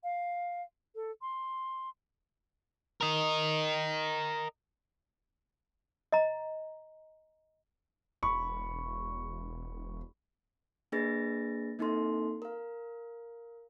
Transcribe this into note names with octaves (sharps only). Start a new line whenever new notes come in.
F5
A4
C6
A#4 D#5
D#5 A#5
E1 B5 C#6
A#3 D4 G#4 B4 A6 A#6
A#3 C4 D#4 E4 A4 C6
A#4 F5